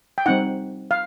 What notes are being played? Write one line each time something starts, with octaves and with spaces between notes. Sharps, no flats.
G5
G3 C4 D#4 F#5
F5